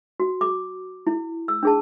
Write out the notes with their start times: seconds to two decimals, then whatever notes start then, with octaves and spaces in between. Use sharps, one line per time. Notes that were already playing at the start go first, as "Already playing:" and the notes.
0.20 F#4
0.41 D6
1.07 E4
1.48 E6
1.63 D4 G#4 A5